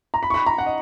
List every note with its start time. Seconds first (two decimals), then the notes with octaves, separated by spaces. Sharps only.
0.14 A#5
0.23 B5
0.30 C#6
0.34 B5
0.46 A#5
0.58 F#5
0.66 D#5